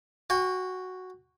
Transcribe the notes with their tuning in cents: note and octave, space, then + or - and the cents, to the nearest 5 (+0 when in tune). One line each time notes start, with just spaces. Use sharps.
F#4 +0 G5 +45